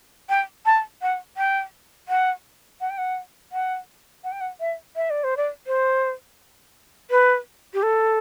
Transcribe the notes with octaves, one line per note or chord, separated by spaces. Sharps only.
G5
A5
F#5
G5
F#5
F#5
G5
F#5
F#5
F#5
G5
F#5
E5
E5
D5
C5
D5
C5
B4
G4
A4